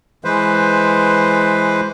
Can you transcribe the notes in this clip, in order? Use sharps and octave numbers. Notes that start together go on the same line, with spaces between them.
E3 G#3 B4 C5